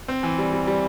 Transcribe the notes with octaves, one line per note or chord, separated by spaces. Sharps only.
C4
E3
G3
G3
G3